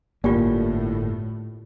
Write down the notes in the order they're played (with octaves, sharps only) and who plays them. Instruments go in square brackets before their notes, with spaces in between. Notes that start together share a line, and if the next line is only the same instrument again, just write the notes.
[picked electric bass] G1 [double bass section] A2 [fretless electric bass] A#3 [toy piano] F4 G4 D5